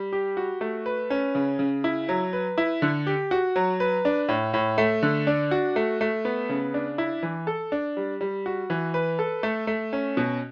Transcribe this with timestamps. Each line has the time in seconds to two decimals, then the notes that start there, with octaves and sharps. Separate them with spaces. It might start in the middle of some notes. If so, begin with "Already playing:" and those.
Already playing: G3
0.13 G4
0.37 F#4
0.61 A3
0.86 B4
1.10 C#4
1.35 C#3
1.59 C#3
1.84 E4
2.09 F#3
2.33 B4
2.58 E4
2.82 D3
3.07 G4
3.31 F#4
3.56 F#3
3.80 B4
4.05 D4
4.28 A2
4.53 A2
4.78 A3
5.03 D3
5.27 D4
5.51 F#4
5.76 A3
6.01 A3
6.25 B3
6.49 C#3
6.74 D4
6.98 E4
7.23 E3
7.47 A4
7.72 D4
7.97 G3
8.21 G3
8.46 F#4
8.70 E3
8.94 B4
9.19 A4
9.43 A3
9.67 A3
9.93 C#4
10.17 B2